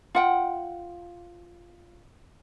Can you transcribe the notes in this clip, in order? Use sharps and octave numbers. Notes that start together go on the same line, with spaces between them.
F4 F#5 G5